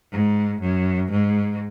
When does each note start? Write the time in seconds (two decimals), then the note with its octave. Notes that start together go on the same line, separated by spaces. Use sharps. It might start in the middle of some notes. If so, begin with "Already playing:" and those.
0.12 G#2
0.61 F#2
1.11 G#2